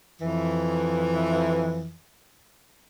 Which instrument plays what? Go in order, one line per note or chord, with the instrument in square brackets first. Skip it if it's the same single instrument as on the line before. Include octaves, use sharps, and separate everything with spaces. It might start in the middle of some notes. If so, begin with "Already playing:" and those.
[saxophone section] F2 E3